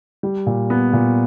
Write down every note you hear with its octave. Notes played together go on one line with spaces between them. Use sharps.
G3
A#2
B3
A#2